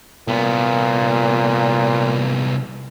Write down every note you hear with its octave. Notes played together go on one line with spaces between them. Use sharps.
C2 A#2 B3